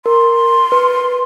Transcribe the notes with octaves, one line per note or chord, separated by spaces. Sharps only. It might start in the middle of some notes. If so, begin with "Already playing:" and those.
A#4 C6
B4